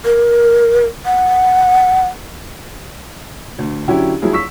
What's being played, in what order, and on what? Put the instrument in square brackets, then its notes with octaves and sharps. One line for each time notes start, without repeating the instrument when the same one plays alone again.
[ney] A#4
F#5
[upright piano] D2
D3 F#3 C#4 E4 G4
G2 F3 F#3 E4 G#4
C#6 E6 B6